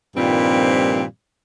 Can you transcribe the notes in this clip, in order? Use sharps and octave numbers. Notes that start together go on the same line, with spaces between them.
G2 A#2 D#3 F3 G3 C4